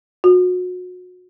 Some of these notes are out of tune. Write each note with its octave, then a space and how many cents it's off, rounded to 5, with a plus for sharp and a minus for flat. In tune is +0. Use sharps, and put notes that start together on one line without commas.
F#4 -30